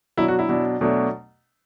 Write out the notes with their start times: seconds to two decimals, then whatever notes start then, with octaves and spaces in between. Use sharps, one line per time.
0.17 B2 F#3 D4 E4
0.28 F#4
0.39 E4
0.49 B2 F#3 D4
0.81 B2 F#3 A3 D4